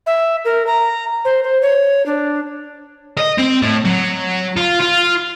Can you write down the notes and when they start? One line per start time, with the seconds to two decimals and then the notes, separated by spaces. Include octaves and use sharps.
0.06 E5
0.45 A#4
0.67 A#5
1.25 C5
1.44 C5
1.62 C#5
2.06 D4
3.17 D#5
3.38 C4
3.62 A2
3.85 F#3
4.57 F4
4.80 F4